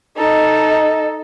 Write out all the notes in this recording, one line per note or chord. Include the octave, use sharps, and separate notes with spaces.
D#4 A4 D#5